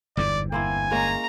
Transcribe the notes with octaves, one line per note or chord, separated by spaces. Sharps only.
G1 E2 G#2 D5
A#3 C4 E4 G#5
G#3 A#3 C#4 A#5